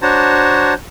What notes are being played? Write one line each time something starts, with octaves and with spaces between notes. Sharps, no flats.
D4 F#4 C5 C#5 A5 A#5